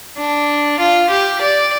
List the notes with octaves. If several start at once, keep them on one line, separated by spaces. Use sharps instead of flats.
D4
F4
G4
D5